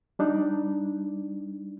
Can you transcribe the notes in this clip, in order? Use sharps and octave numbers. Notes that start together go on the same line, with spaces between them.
G3 D4 D#4